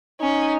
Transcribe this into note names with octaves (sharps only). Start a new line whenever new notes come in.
C#4 D#4